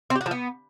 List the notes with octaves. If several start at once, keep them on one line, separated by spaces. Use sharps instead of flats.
C4
G4
F#4
F3
B3